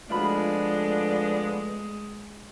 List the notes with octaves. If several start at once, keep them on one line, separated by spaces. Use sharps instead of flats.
F3 G#3 A3 B3 D4 F4 F#4 B5